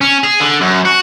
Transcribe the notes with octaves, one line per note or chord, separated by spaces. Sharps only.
C#4
G#4
D3
F#2
F#4